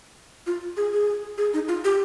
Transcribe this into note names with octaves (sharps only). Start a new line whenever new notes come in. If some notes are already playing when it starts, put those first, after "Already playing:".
F4
G#4
G#4
G#4
D#4
F4
G4